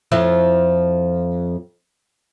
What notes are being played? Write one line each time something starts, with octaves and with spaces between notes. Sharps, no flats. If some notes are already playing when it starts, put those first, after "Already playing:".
F2 F3 E4